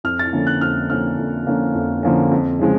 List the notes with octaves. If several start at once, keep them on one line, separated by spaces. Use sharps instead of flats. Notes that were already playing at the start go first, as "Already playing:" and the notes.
F2 F6
A6
D3 F3 A#3 C#4
F#6
F2 F6
D3 F3 A#3 C#4 F6
F2
D3 F3 A#3 C#4
F2
D3 F3 A#3 C#4
F2
C#3 F3 G#3